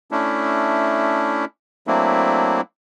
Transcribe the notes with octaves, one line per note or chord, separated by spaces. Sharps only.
A3 C#4 D4 E4
F#3 A3 A#3 C4 D4 E4